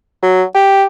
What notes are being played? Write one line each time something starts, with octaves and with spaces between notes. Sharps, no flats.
F#3
G4